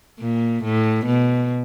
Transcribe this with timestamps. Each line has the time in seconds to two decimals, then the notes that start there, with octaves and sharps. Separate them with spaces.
0.20 A#2
0.64 A2
1.06 B2